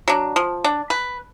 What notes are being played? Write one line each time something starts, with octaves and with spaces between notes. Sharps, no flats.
F#3 D4
F3
D4
B4